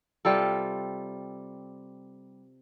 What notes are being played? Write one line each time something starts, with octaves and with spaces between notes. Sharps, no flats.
C3 G3 F4 A4